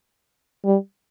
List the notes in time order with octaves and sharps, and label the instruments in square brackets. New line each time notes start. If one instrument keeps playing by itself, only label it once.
[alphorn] G3